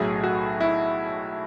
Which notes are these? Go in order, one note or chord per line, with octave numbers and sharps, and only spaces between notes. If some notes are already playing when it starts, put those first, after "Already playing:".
Already playing: B1 A2 F#3 G#4
F#4
E4